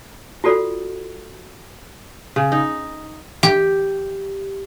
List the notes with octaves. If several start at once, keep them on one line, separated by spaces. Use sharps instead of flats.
F4 F#4 A4 D5
C#3
D#4
G4